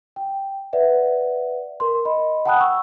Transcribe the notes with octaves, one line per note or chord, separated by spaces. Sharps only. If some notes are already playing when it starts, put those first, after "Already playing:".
G5
B4 D5 E5 F#5
A#4 C6
D#5 B5
F#5 G5 A5 B5 D#6 F#6
C#6 E6